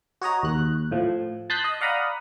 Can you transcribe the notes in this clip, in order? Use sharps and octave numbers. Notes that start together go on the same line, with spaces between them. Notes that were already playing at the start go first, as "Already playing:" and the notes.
F#4 C#5 D#5 A#5
D#2 F#6
A2 F3
A5 C6 D#6 F#6 G6 B6
D#5
D5 F5 F#5 A#5 B5 D#6